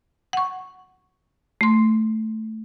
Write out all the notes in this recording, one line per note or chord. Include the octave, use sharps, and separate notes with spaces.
F#5 C#6
A3 C6